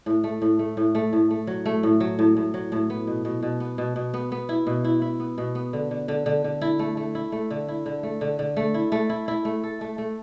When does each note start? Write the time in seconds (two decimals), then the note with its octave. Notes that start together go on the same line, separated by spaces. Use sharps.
0.06 A2
0.24 A3
0.42 A2
0.59 A3
0.77 A2
0.95 A3
1.13 A2
1.30 A3
1.47 F#3
1.65 A3
1.83 A2
2.00 F#3
2.19 A2
2.37 A2
2.54 F#3
2.72 A2
2.90 B3
3.07 B2
3.25 B2
3.43 B2
3.60 B3
3.78 B2
3.96 B2
4.14 B3
4.32 B3
4.49 E4
4.67 B2
4.84 E4
5.02 E4
5.20 B3
5.38 B2
5.55 B3
5.73 D3
5.91 D3
6.08 D3
6.26 D3
6.44 D3
6.61 E4
6.79 A3
6.97 A3
7.15 E4
7.32 A3
7.51 D3
7.68 E4
7.86 D3
8.03 A3
8.21 D3
8.39 D3
8.57 A3
8.74 E4
8.92 A3
9.10 E4
9.28 E4
9.45 A3
9.63 A4
9.81 A3
9.98 A3